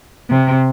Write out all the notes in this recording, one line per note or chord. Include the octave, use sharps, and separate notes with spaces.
C3